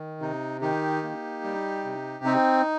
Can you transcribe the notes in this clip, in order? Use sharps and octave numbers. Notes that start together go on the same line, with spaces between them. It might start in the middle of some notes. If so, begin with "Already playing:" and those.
Already playing: D#3
C3 D#4
D#3 D#4 G4
A#3
G3
C3
C4 D#4